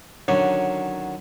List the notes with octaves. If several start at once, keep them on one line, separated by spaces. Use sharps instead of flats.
D3 D#3 F#3 C#4 D4 C#5